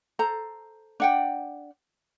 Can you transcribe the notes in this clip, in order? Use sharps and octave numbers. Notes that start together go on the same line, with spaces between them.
A4 C5 A#5
D4 F#5 G5